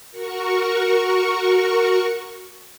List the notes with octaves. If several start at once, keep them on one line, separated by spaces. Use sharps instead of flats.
F#4 A#4 C#6